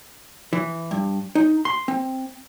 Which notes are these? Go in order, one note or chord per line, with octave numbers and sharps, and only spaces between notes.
E3
G2
D#4
C6
C4